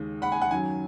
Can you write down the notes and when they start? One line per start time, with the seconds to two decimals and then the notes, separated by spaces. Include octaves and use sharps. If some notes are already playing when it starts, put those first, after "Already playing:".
Already playing: D#2 C#3 G#3
0.22 F#5 B5
0.32 G#5
0.42 F#5
0.51 F#2 D#3 F#3 G#5